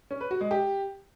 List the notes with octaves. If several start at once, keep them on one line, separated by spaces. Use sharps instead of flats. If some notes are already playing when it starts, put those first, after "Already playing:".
C#4
B4
F#4
G#3
G4